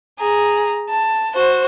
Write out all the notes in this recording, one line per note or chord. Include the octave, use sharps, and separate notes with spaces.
G#4 A#5
A5
F#4 C5